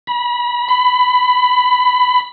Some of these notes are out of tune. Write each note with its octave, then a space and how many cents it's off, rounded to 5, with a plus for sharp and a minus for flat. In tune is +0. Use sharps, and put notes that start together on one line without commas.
B5 -35
B5 +15